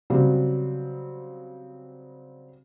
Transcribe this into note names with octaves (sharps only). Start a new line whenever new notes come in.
C#3 F#3 G3 C4